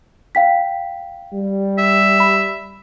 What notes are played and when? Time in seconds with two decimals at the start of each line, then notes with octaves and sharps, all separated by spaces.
0.35 F5 G5 B6
1.34 G3
1.78 E5
2.20 B5